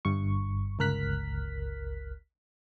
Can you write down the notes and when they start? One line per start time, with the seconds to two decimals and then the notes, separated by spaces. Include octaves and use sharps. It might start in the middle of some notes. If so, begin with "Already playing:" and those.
0.05 G1 G2 C#6
0.79 G1 C#2 A#4 F6 F#6 B6